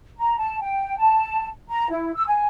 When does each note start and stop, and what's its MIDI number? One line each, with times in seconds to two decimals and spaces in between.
0.18 0.35 82
0.38 0.58 81
0.60 0.95 79
0.98 1.47 81
1.68 1.89 82
1.90 2.11 64
2.14 2.22 88
2.26 2.48 80